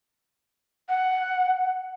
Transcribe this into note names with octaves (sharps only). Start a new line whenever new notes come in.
F#5